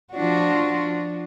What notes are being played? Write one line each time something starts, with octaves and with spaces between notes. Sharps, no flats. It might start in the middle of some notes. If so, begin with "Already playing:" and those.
F3 D4 F#4